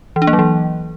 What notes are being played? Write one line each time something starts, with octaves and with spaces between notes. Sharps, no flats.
E3
D4
A#3
F#3
E3